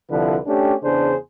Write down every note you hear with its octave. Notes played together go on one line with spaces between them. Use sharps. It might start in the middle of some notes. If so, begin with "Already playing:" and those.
C2 D3 F3 E4 B4
A3 C#4 D4 G4
E2 C#3 D4 G#4 C5